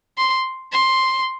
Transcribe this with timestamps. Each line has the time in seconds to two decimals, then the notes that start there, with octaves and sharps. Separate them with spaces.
0.17 C6
0.72 C6